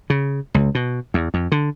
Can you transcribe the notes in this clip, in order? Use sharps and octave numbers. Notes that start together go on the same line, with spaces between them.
C#3
C#2
B2
E2
F2
D3